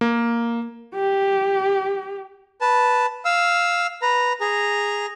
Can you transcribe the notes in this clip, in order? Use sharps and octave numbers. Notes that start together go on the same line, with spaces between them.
A#3
G4
B4 A5
F5 E6
B4 A#5
G#4 A#5